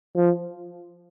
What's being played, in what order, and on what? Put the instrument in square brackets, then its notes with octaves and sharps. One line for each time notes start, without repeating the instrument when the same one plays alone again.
[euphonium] F3